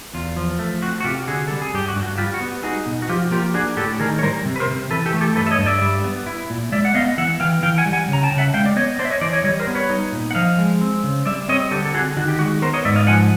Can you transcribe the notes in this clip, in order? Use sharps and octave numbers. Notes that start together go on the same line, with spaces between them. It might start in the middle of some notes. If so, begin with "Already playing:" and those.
E2 F4
F3
A3
C4 F#4
F#4
C3 F4 G4
D3 F#4 G#4
G3 A4
G#4
G2 G4
F#4
G2
F#4
G3 F4 G4
F#4
B3
D#4 F#4 G#4
B2
F#4
F3 F4 G4
A#3 F4 G4
D4 F#4 G#4
A2 G4 A4
D#3 G#4 A#4
C#5
G3 A#4 C5
C3
B4
A#4 C5
C3
E3 A4 B4
G4 A4
A3
G4 A4
G2 A4 B4
E5
C#5 D#5
G2
D5 E5
G3
B3
E4
A#2
G#3 D5 E5
F#5
B3 D#5 F5
E3 E5 F#5
E3 F5 G5
E3 F5 G5
F#5 G#5
G3
F#5 G#5
C#3 A#5
G5 A5
C#3
E5 F#5
G#3 F5 G5
D5
B3 C#5 D#5
D4 C5 D5
E5
C#5 D#5
E3 C5 D5
C#5 D#5
G3 C#5 D#5
A#4 C5
B3
B4 C#5
D#4
A#2
F#5
F3 D#5 F5
G#3
C4
C#3
G3 D5 E5
C4 C#5 D#5
D3 G4 A4
A4
D3 F#4 G#4
D#3 F#4
G4
G#3 F#4
B3 A#4 C5
C#5 D#5
G#2 D5 E5
D#5 F5
F3 F#5 G#5